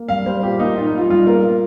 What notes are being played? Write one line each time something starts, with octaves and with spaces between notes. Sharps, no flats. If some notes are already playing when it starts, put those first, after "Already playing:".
Already playing: A#3
G2 F5
G3 C5
A#2 G4
A#3 D#4
A#2 F4
D#4
G3 F4
G2 F4
A#3 A#4